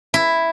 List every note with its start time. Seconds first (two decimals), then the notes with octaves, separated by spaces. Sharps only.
0.14 E4